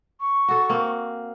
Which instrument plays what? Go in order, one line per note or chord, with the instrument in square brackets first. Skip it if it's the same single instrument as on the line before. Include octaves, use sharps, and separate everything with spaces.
[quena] C#6
[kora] F#4 A4
A#3 C4